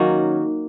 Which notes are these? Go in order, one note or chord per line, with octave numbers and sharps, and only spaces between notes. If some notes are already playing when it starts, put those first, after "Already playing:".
Already playing: D#3 F#3 A#3 C#4 F#4